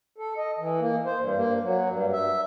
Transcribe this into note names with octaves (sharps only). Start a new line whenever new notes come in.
A4
D#5
E3
A#3
C5
G2
A#3
F#3
G2
E5